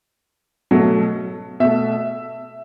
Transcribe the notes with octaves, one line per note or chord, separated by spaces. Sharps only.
B2 F#3 A3
B2 A3 E5